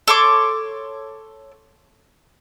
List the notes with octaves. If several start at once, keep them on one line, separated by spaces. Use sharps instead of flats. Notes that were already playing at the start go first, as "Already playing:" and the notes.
A4 C#5 C6 D6